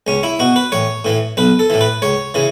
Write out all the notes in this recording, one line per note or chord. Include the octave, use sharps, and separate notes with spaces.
C#2 C#4
E4
B2 F#4
B4
A1 C#5
A2 E3
B1 B4
A4
A2 E3
B4
C#2 C#5
C#3 E3